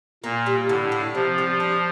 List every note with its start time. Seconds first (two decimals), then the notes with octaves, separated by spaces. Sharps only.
0.24 A#2 A#3
0.46 G3
0.69 A2 D3
0.92 D4
1.15 C3 F3
1.38 G3
1.60 D4